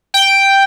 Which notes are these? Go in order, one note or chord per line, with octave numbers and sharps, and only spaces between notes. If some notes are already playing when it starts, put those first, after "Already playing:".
G5